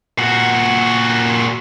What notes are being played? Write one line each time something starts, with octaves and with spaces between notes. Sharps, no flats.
A#2 F#4